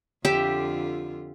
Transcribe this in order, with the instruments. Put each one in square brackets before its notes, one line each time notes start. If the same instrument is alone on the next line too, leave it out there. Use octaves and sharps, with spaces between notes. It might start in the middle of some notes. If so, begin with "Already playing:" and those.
[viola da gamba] F2 D3 F4 [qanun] G4 E5